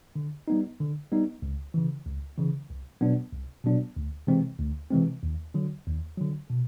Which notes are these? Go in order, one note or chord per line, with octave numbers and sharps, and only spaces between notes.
D3
G3 B3 D#4
D3
G3 B3 D#4
C#2
C#3 E3
C#2
C#3 E3
C2
B2 F#3 B3 D4
C2
B2 F#3 B3 D4
D2
C3 E3 G#3 C4
D2
C3 E3 G#3 C4
D#2
D3 F#3
D#2
D3 F#3
B2